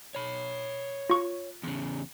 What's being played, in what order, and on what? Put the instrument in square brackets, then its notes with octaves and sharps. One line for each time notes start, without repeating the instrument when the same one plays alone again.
[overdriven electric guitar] C#5 B5
[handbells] F4 C#6
[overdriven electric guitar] E2 C#3